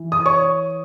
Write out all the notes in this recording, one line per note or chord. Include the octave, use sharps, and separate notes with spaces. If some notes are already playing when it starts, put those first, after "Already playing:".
Already playing: E3
D#6
C#5 C#6